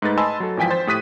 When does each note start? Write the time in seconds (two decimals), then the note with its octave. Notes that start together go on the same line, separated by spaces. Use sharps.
0.02 G#2 A3 D#4 B4 A6
0.18 D#5 G#5 A5 B5 C6 E6
0.40 F#3 A4
0.57 G#1 E3 F3 G5 G#5 B6
0.70 C5 A6
0.87 A2 G4 D#6 F#6 B6 D#7